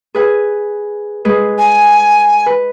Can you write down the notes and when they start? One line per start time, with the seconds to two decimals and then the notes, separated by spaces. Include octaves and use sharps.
0.15 G#4 B4 G#5
1.25 G#3 G#4 B4
1.58 G#5
2.46 B4